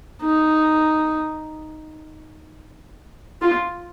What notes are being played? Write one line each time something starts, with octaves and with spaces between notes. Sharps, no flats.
D#4
F4